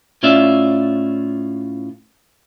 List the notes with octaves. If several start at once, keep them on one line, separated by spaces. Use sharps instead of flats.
A2 C#4 F4 D5 E5